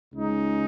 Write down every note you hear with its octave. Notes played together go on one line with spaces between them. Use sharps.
C#2 C#3 G#3 D#4